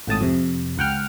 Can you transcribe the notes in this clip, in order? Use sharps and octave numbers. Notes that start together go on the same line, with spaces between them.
G#1 A2 A5 D#6
F2 C3
C#2 F#5 G5 F6